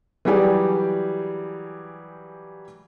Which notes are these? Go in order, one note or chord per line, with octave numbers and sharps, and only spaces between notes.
E3 F#3 G3 G4 G#4 D5